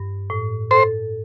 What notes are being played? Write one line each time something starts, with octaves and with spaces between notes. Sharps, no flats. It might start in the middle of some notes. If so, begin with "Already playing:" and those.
Already playing: G2
A2
A4 C5